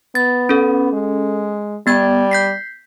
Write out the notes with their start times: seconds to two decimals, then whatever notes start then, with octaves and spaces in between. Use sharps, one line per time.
0.15 B3 A6
0.49 C#4 A4
0.93 G#3
1.87 G3 B3 G#6
2.31 G6 B6 C7